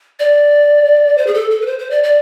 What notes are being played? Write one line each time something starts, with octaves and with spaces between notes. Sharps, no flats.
D5
C5
G#4
A4
A4
B4
C5
C5
D5
D5